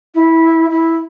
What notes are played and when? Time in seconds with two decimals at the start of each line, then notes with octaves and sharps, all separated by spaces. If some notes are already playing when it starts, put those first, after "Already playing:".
0.14 E4
0.70 E4